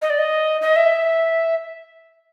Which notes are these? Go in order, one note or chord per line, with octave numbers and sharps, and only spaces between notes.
D#5
D5
D#5
D#5
E5